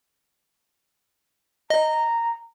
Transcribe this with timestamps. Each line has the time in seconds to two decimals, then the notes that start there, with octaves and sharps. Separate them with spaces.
1.70 D#5 A#5